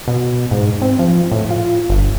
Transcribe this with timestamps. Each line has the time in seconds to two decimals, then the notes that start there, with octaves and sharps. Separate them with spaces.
0.08 B2
0.51 G#2
0.82 C4
0.99 F3
1.31 A2
1.50 F4
1.90 G1